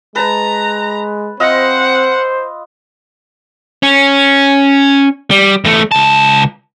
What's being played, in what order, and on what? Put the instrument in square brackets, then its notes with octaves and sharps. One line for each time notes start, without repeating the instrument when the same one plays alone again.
[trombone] G#3 [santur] B4 A5 [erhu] A#5
[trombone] C4 [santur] F4 D#5 E6 [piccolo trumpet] C5 [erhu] F#5
[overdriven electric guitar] C#4
G3
E2 A3
C#2 A5